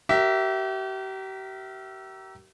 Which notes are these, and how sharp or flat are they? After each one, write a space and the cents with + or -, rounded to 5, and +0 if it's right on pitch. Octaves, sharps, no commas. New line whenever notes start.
G4 -40 A#4 +0 E5 +0